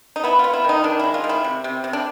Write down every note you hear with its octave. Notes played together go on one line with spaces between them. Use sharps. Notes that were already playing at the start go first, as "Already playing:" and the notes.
D#4
B3 E4
B3 F4
E4
D#3 D#4
D#3 D4
G#3 E4
F4
D#3
E4
C3
C3
C3
D4